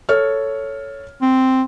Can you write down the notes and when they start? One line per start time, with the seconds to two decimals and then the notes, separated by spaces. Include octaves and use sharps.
0.09 A4 C#5 F6
1.22 C4